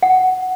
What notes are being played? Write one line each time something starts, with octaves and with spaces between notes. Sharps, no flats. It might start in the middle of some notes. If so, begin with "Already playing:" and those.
F#5